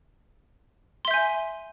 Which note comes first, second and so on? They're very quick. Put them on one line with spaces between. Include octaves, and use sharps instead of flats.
C6 E5 G6 G#5